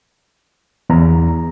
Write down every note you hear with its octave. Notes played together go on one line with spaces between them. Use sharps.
E2 A#5